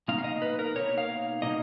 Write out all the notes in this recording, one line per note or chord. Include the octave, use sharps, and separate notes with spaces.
B2 A#3 D#4 F5
F5
D#5
B4
A#4
B2 A#3 D#4 C#5
F5
B2 A#3 D#4 D#5